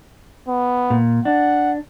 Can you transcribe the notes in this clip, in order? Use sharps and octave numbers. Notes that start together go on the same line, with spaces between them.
B3
A#2
D4 F#5